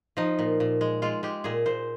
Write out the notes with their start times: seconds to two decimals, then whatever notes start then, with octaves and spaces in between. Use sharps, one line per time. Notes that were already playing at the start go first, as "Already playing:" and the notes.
0.17 F3 D#4
0.39 A#2
0.60 A#2
0.81 G#3
1.02 G#3 F4
1.23 G#3 G4
1.44 A#2 G#4
1.66 A#2 C5